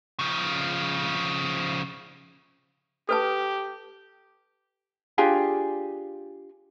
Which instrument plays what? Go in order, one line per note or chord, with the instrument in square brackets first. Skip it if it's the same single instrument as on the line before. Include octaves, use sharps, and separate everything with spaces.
[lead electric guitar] C#3 F3
[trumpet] G4 [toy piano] A4 B4 A5
[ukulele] D4 F4 G4 G#4